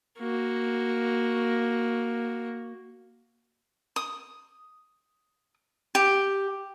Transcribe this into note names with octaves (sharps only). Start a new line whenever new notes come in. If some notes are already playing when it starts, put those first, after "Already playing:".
A#3 F#4
D#6
G4